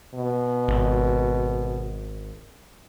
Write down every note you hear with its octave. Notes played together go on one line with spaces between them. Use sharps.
B2
G#1